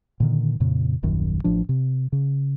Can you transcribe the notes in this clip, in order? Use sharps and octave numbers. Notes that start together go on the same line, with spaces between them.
A#2 D3 D#3
F2 A#2 C#3
D#1 A#1 F#2 D#3
A1 A2 F3 D4
C3
C#3